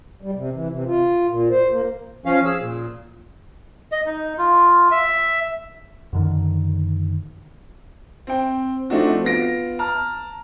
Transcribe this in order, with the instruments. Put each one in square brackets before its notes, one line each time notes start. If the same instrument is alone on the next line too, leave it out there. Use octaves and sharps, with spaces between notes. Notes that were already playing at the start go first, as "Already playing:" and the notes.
[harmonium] G3
C3
E3
C3
F4
A#2
C5
A#3
[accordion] F3 C#4 F5
G#4 E6
A#2
[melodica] D#5
D#4
F4
E5
[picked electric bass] F#2 D3 D#3
[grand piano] C4 G5
F3 A3 C4 D4 D#4 F#4
B3 F4 A#6 D7
A5 A#5 F6